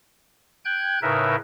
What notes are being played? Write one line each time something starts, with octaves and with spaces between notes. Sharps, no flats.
G5 F#6 G#6
A2 C#3 D#4 A#4 B4 E5